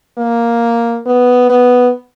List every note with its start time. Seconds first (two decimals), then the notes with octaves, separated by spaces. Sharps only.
0.18 A#3
1.06 B3
1.50 B3